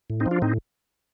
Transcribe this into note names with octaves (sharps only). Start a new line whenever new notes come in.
A2
C4 D#4
F3
D4 F4
A2 C4 D#4